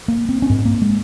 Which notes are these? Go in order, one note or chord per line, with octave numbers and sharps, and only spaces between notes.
A#3
C4
C#4
G#2 C4
A#3
G#3